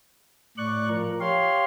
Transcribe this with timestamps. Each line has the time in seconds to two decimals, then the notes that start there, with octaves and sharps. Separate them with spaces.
0.58 A2 D5 C#6 F#6
0.89 F3 A#4
1.20 G4 C#5 F5 C6